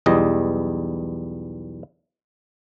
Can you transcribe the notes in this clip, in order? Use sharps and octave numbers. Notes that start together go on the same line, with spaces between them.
B1 E2 G3 D#5